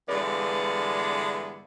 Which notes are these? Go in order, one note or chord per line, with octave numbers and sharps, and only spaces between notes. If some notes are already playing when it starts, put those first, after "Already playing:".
G2 D3 E3 G#3 B3 D5